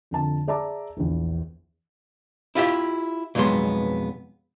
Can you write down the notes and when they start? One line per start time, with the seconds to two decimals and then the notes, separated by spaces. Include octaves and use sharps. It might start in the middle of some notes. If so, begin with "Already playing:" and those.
0.11 F2 D3 A5
0.48 G#4 D5 E5 A5 A#5 D6
0.97 A#1 E2
2.55 E4 F4 G4 E5
3.35 B1 F2 F#3 G#3 B3 C6